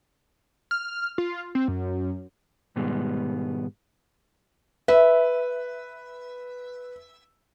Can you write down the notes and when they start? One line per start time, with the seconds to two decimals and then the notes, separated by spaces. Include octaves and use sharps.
0.71 F6
1.18 F4
1.55 C4
1.68 F#2
2.76 G#2 B2 D#3 G3 G#3 B3
4.88 B4 E5